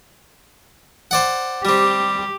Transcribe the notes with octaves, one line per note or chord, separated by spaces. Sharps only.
C5 D5 F#5
G3 C4 G4